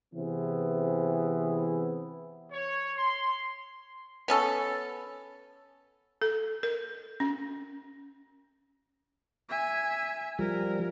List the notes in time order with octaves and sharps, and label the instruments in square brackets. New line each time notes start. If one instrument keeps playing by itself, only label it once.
[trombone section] C3 E3 B3 G#4
[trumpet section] C#5
C6
[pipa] B3 C#4 A4
[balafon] A4
A#4
C#4
[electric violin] E5 G#5
[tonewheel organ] F3 G3 [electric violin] A#4